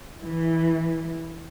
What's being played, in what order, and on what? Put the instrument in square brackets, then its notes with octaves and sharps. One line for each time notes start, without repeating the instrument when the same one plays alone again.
[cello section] E3